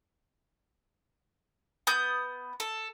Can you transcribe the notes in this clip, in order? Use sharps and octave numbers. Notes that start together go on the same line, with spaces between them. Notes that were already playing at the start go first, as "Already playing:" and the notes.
B3 D#6 G6
A4